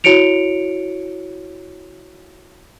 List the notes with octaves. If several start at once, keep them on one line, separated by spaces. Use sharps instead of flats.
E4 F#4 C#5 C#7 D7 F7